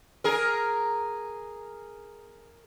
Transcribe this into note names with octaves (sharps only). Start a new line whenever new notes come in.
G#4 A#4